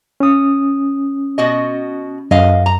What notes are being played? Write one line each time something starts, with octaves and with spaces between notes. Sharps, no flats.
C#4 D#6
B2 F#4 D#5
F#2 D#5 F5
A#5